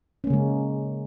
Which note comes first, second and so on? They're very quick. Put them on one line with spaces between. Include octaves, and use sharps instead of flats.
C#4 A#3 C#3 G#3